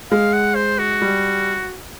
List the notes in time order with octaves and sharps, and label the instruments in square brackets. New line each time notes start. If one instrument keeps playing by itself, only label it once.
[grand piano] G#3 [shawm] F5
[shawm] F#5
C5
F#4
[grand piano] G3